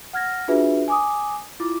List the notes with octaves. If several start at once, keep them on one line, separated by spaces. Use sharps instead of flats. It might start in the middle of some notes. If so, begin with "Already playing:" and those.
F#5 F6 G#6 A#6
D4 F4 F#4 G#4 B4 E5
G#5 D6 D#6
E4 F4 D6